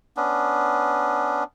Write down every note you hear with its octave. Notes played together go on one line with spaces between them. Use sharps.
B3 C#4 D4